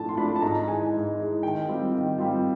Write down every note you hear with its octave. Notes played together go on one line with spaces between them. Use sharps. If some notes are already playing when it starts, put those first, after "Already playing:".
Already playing: A2 F3 A3 D4 A5
C6
F3 A3 D4 B5
A5
G#2 A#5
E3 G#3 G#5
G#2
E3 G#3
D#3 G5
G3 C4 F4
D#3
G3 C4 F4